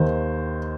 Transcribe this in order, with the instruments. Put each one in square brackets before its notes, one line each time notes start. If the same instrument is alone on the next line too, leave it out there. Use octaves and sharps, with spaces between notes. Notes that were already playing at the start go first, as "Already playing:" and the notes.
Already playing: [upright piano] D#2 D#3 C5